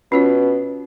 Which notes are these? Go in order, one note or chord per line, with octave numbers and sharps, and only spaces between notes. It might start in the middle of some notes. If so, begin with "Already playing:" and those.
B2 C#4 F4 C#5